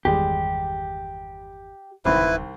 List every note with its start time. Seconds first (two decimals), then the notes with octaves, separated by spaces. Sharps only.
0.05 G1 E2 D#3 G3 G#3 G4
2.05 D1 C2 D#3 C4 E4 B4